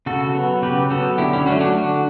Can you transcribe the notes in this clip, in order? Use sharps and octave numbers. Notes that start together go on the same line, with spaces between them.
C#3 F#4 A4
F#3 B3
C#3 G4 B4
F#3 B3 F#4 A4
D3 E4 G4
C#4 E4
F#3 A3 C#4 D4 F#4
D4 F#4
D3